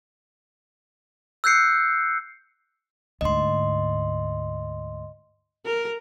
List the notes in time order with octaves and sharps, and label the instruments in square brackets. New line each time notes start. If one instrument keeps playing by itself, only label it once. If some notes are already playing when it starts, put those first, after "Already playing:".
[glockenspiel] E6 F#6 G6 C7 C#7
[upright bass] D2 G#2 [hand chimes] D#5 C6
[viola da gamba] A#4